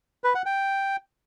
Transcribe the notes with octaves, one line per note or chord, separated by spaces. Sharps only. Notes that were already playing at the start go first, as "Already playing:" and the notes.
B4
F#5
G5